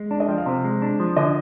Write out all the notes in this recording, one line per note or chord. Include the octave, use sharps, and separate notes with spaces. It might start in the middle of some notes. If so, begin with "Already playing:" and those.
Already playing: G#3
D4 D5
D#5
F3 G5
F5
C3 C5
G#3
D4
F3
D3 D#5